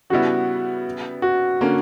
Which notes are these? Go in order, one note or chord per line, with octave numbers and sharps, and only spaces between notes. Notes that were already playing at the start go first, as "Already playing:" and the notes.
C#3 G3 B3 E4 F#4
F#4
D3 A#3 C#4